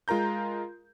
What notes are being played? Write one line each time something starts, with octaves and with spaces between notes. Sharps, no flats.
G#3 F4 A#4 A#5 G6